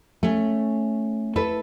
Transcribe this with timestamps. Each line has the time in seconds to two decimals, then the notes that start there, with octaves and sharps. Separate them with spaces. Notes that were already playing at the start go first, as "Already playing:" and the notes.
0.23 A3 C#4
1.36 E4 A4 B4